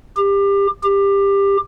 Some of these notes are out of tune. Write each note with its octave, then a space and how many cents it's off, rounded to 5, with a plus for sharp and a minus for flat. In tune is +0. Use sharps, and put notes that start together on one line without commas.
G4 +25
G4 +20